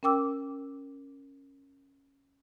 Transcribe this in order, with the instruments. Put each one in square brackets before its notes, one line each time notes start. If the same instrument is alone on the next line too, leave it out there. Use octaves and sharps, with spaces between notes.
[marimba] C#4 A#4 G5 D6 E6